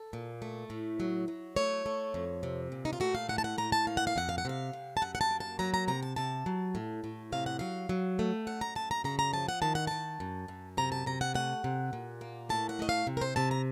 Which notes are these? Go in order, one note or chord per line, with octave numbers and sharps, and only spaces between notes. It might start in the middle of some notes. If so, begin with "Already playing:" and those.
Already playing: A4
A#2
A3
A2
F#3
F#3
A3 C#5
A3
F2
C3
A#2
D#4
F4
A3 F#4
F5
A2 F#5
A5
F#5
A2 A#5
A5
A#3 F5
F#5
F5
F2 F#5
F5
F#5
C3 F5
C3
A5
F#2 F#5
F#5
A5
A#3
A5
F#3 A#5
A#5
C3 A#5
A5
C3 A5
F#3
A2
A2
C3 F5
F#5
F#3 F5
F#3
A3
F#2 F#5
A#5
F#2 A5
A#5
C#3 A#5
A#5
F3 A5
F#5
D#3 A5
F#5
D#3 A5
F#2
F#2
C3 A#5
A5
C3 A#5
F#5
A3 F#5
C3
A#2
A#3
A2 A5
F#5
A3 D#5
F5
C3
A#4
C5
C3 A5
A#5